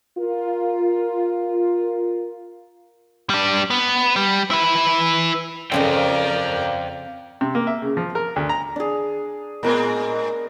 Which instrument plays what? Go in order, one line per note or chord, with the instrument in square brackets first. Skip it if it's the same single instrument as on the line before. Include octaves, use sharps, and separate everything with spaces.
[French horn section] F4 A#4
[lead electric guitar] G3 D4
B3
G3
E4 B4
[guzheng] F2 C#3 D#5 [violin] A#4 D5 [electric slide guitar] C5 F5 G5
[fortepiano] C3
A#3
E5
C#3
F3
A#4
D2
A#5
[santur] D4 G#4
[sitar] A2 G#3 C4 [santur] B3 A#4